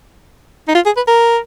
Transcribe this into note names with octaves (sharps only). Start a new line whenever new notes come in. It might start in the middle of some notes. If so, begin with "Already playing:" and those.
D#4
F4
G#4
B4
A#4